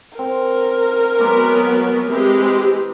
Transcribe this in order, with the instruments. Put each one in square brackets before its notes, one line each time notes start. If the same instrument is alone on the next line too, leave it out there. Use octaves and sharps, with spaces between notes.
[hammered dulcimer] C4 [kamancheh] A#4
[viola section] F#3 B3 [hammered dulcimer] G#3 D5 A#5
[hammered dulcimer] E3 E4 [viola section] G#3 C4 G4